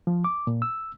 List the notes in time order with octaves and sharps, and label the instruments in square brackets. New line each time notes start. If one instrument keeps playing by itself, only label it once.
[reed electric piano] F3
D6
A#2
E6